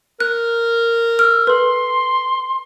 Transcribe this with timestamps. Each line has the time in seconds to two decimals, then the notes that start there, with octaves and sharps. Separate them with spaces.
0.20 A#4 F#6
1.19 E6 F6
1.47 A4 B4 C6